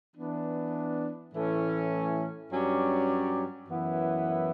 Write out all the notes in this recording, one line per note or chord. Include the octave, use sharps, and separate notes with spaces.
E3 B3 D4
A2 E3 A3 C#4
G2 F#3 C#4 G4 D5
F#2 E3 B3 E4